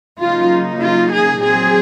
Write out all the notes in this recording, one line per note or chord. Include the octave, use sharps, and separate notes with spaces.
C#3 F#3 A#3 D#4 F4
F4
G#4
A#2 F#3 C4 G#4